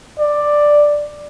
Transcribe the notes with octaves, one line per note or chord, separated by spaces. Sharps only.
D5